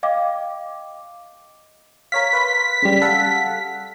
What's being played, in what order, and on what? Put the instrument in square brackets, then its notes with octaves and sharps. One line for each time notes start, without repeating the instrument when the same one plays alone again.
[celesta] D#5 F5 G5 D6
[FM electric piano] A#4 C#5 F5 [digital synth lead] B6
[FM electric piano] B4 F5 C6
C#3 G3
A4 F5 F#5